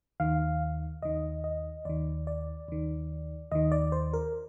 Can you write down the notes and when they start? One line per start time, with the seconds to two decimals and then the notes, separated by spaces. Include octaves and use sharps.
0.20 D#2 D#3 F5
1.02 D#2 D#3 D#5
1.44 D#5
1.85 D#2 D#3 D5
2.27 D5
2.68 D#2 D#3
3.51 D#2 D#3 D#5
3.72 D5
3.92 C5
4.13 A#4